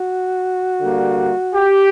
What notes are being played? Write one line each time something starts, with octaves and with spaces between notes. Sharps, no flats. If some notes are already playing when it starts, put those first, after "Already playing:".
Already playing: F#4
D3 G3 A#3
G4